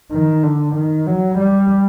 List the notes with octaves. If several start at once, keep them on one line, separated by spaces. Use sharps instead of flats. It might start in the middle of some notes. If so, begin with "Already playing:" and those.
D#3
D3
D#3
F#3
G3